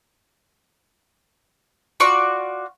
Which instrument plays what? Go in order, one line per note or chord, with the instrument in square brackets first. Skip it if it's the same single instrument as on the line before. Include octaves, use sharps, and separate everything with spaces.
[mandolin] F4 F#4 D5 C#6